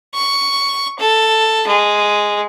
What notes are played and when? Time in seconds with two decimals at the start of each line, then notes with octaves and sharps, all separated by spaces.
0.14 C#6
0.99 A4
1.67 G#3